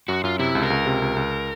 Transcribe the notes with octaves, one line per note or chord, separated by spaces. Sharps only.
F#2 F#4
F#2 F4
C3 E4
C#2
A#4
C#2
C3
C#2
C#2